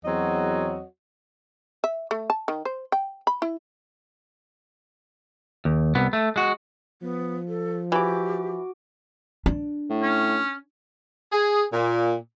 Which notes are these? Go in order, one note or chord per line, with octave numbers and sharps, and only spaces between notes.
E2 F#3 C4 F#4 C#5 D#5
E5
A3
A5
D#3
C5
G5
B5
E4
D#2
C2 B3
A3
G#3 F#4
F3 B3
A4
E3 F#4 G4 D6
D4
A2
C#4
G#4
A#2